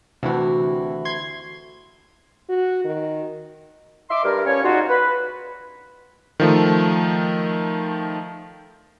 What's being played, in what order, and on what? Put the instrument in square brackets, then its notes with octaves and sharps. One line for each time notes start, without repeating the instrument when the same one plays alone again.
[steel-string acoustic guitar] D2 E4 F#4 [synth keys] C3 E3
[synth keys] C6 G#6
[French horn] F#4
D#3
[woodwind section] D#5 E5 C6 D6
G2 A#4
F3 G3 C#4 C#5
A#2 G#3 D#4 F4 F#4
B4
[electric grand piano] D#3 F3 A3